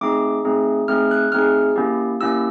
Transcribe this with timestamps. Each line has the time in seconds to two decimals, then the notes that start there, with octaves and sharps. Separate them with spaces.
0.01 A3 C4 D#4 G#4 D6
0.45 A3 C4 D#4 G#4
0.88 A3 C4 D#4 G#4 F6
1.11 F#6
1.32 A3 C4 D#4 G#4 F6
1.76 A#3 C#4 E4 G4
2.20 A#3 C#4 E4 G4 E6